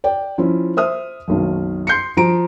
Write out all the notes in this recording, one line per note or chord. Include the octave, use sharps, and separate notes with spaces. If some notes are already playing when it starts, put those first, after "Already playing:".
D5 G5
F3 C#4 E4
C5 E5 D#6 F6
F#1 B1 D#3
C6 G6 C7 C#7
F3 A#5 D7